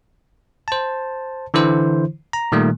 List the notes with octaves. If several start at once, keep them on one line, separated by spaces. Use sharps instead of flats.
C5 A5
D3 E3 E4 C5
A#5
A#2 D#3 G3 A3